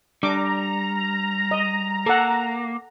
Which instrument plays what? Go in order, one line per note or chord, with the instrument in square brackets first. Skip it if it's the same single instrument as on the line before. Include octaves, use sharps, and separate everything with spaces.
[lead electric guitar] G3 [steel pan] D4 D6 [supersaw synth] A#5
[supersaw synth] A#5
[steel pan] D#5
[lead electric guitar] A#3 [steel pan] A4 F#5